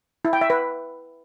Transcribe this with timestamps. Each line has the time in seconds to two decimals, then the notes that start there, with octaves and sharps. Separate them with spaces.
0.25 E4
0.33 G5
0.41 E5
0.50 B4